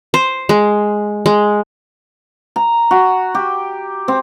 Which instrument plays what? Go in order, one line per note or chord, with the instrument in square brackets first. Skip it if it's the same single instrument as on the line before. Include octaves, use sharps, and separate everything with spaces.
[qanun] C5
G#3
G#3
[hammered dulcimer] A#5
F#4
G4
C4